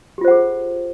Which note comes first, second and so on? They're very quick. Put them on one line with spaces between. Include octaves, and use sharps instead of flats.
G4 F4 C5 F#5 G#4